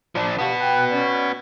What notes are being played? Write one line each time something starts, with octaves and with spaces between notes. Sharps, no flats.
F3 D4
B3 F#4 G4 F5 A5
G5 F#6
C#4 D5